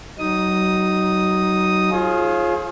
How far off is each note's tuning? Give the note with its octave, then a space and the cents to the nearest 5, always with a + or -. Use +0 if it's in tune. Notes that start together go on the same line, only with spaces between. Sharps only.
F#3 +30 D#4 +0 D#6 +0
F4 +0 G#4 +30 C#5 -45